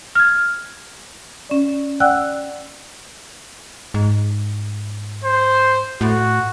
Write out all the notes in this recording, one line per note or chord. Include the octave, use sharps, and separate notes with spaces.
F6 G#6
C#4 D5
D5 F#5 G5 E6 F#6
G#2
C5
A2 F#4